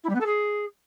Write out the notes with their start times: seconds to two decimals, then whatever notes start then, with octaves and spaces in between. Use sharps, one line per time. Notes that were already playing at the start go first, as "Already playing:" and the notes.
0.03 E4
0.09 G3
0.14 B3
0.20 A4
0.26 G#4